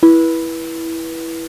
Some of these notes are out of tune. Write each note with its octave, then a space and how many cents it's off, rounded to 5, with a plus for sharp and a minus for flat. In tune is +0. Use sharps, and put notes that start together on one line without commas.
E4 +0 B4 -25